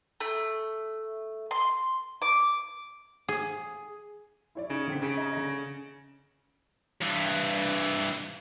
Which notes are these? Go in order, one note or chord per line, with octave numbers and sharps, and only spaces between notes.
A3
C6
D6
G#4
E4 C#5 D5
C#3 D#4
D3 C4 B6
C#3 G#4
D#5 A#5
D3 A#6
G2 E3